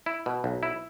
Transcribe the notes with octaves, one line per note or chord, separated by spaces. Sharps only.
E4
B2
B1
E4